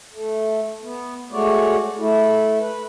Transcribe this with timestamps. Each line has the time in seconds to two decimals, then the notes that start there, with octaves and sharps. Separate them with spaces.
0.13 A3
0.82 B3
1.32 G#3 A3 F#4 C#5 D5
1.98 A3 E4
2.59 B4